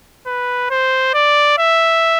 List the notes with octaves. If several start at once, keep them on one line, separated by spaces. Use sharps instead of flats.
B4
C5
D5
E5